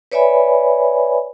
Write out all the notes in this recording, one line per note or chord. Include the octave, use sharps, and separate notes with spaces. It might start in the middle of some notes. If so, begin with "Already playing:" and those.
B4 C#5 D5 E5 G#5 B5